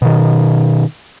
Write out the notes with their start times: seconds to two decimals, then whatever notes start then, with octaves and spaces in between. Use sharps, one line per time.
0.02 B2 D#3